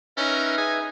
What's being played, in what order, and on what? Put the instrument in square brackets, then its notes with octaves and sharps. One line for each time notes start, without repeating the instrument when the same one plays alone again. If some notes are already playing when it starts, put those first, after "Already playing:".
[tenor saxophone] C#4 [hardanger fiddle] D#4 [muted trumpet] A#4 [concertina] B4 E5
[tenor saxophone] G#4 [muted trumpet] G#5